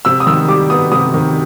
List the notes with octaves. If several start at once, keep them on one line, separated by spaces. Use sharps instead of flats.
C3 E6
D#6
D#3 E6
G3 D6
B3 D#6
C3 D#6
D#3